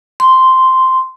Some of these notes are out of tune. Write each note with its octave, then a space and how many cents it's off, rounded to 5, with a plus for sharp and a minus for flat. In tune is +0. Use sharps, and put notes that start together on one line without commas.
C6 -5